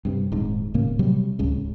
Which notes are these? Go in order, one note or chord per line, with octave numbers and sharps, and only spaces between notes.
G2 C3
D#1 G#2
D#1 A2 C#3 A#3
C3 F#3 G3
D1 C#2 C#3